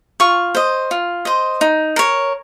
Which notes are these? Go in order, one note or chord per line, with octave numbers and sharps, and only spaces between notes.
F4 C#6
C5 D#5
F4
C5 D#5
D#4
A#4 C#5